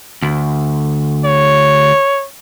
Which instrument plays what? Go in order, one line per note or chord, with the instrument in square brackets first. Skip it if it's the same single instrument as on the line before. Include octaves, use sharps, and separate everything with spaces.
[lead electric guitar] D2
[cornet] C#5